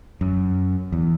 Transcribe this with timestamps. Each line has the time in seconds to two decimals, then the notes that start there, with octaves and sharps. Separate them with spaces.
0.21 F#2
0.92 E2